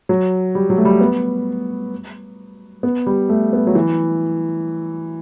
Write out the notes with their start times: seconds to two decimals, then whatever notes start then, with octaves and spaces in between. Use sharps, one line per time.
0.09 F#3
0.55 G3
0.70 F#3
0.78 A3
0.85 G3
1.01 B3
2.83 B3
3.06 G3
3.29 A3
3.53 B3
3.67 F#3
3.75 E3